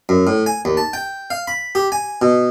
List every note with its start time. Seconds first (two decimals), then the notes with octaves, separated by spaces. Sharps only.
0.09 F#2
0.27 A2
0.46 G#5
0.65 D#2
0.77 A5
0.93 G5
1.30 F5
1.47 B5
1.75 G4
1.92 G#5
2.22 B2